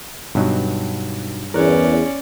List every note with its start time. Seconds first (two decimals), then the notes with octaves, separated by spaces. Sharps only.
0.35 G2 B2 F#3 D#4 F#4
1.54 E2 C#4 A#4 D5 F#6